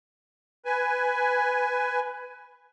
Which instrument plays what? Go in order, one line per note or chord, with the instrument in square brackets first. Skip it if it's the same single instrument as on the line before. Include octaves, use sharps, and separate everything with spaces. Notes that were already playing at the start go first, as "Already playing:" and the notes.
[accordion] B4 G#5